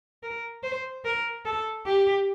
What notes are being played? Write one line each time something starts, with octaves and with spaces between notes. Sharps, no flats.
A#4
C5
A#4
A4
G4